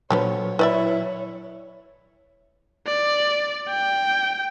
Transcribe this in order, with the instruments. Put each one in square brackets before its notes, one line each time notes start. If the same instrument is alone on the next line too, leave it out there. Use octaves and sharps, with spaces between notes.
[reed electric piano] A#2 F#3 [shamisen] D3 F3 B3 [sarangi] C#5
[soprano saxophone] E4 [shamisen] B4 D5 E5
[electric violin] D5
G5